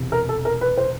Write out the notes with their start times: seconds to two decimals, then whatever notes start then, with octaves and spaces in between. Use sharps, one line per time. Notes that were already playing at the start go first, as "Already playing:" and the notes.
Already playing: E1 E2 C3
0.12 A#4
0.29 A4
0.45 A#4
0.61 B4
0.78 C5